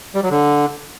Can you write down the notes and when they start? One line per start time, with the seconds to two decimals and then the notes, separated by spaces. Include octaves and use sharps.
0.15 G3
0.23 F#3
0.31 D3